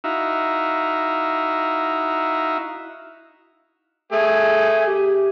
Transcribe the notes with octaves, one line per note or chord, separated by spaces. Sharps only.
D#4 E4 F#4 E5 F5 A#5
A3 G#4 E5
G4